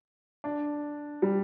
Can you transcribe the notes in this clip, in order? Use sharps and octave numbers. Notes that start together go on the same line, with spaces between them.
D4
G3